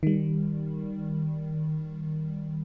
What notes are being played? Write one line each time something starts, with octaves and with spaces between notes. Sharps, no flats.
D#3 G3